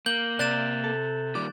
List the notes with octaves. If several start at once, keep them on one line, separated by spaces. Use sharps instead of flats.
A#3 G6 F#7 G7
C3 D5 F#6 A6 E7
A4
A#2 D#3 G3 D6